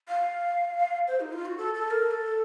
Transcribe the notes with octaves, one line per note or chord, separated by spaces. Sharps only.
F5
C5
D#4
F4
F#4
A4
A4
A#4
A#4
A4